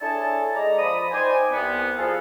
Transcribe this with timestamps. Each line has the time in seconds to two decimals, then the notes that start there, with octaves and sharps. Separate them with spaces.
0.01 D4 E4 G#4 A4 C#5 A5
0.55 G#3 D5 A#5
0.78 F3 B5 D#6
1.12 D#4 C5 D5 D#5 G5 G#5
1.52 C2 B3
1.96 F3 G#4 A4 F5